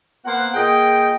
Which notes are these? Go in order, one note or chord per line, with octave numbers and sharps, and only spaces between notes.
A#3 B3 C5 F#5
A#2 G#4 D#5 G5